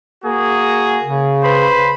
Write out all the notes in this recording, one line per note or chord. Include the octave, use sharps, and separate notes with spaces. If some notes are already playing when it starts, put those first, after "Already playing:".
A#3 F#4 G#4
C#3
B4 C5 B5